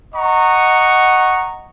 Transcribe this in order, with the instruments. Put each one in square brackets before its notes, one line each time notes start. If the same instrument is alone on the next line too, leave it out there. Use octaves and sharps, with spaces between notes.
[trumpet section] D#5 F#5 A#5 C#6